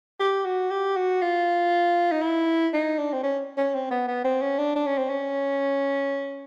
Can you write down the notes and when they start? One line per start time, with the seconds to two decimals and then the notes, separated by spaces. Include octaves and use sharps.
0.20 G4
0.45 F#4
0.71 G4
0.96 F#4
1.22 F4
2.12 D#4
2.22 E4
2.73 D#4
2.98 D4
3.13 C4
3.23 C#4
3.58 C#4
3.75 C4
3.91 B3
4.08 B3
4.25 C4
4.42 C#4
4.58 D4
4.76 D4
4.87 C#4
4.98 C4
5.10 C#4